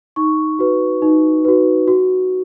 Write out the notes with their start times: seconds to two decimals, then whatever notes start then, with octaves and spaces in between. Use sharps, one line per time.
0.16 D#4 C#6
0.59 F#4 B4
1.02 D#4
1.45 F#4 B4
1.88 F#4